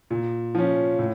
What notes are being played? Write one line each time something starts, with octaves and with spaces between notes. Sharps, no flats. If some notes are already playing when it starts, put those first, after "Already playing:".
A#2
F3 C#4
A2